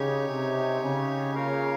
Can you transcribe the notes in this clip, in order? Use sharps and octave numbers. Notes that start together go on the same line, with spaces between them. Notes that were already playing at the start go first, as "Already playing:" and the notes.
Already playing: C#3 D#4 G4 C#5 G#5
C3
C#3
A#3 F4 A#4 C#5 F5